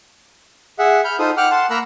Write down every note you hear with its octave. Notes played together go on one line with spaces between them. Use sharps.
G#4 E5 F#5
B5 F6 G6
D#4 F4 A4 C5 D#6
F#5 G5 D6 F6 F#6
F#5 A5 C6
A#3 A#4 A#5 B5 E6 F#6